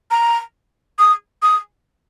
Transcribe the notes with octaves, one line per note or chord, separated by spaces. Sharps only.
A#5
D#6
D#6